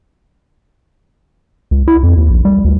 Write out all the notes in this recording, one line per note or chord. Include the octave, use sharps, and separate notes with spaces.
C#2
E4
F2
D#2
A#1
G3
D2